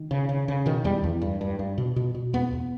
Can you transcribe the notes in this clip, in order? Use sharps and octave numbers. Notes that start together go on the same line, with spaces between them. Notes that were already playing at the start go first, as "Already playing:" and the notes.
Already playing: D#3
C#3
C#3
C#3
B2 D#3
E2 G3
E2
G2
G2
G2
B2
B2
B2
E2 B3
E2